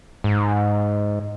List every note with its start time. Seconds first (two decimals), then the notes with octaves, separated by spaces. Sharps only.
0.24 G#2